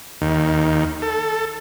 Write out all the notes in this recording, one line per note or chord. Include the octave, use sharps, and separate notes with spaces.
D#2
A4